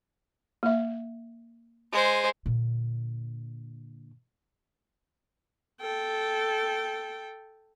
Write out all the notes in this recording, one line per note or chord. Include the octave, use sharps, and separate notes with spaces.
A#3 E5
G#3 C5
A#2 D3
A4 G5